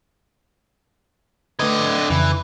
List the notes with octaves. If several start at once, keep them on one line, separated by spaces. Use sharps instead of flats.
D3 A3 B4 D#5 G#6
F2 C#3 E3